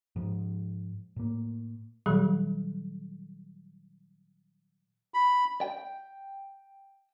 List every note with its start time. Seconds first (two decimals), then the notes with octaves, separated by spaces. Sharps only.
0.16 G#2 F3
1.16 A2 A#3
2.06 A#2 D#3 F#3 G3 G4
5.14 B5
5.61 G5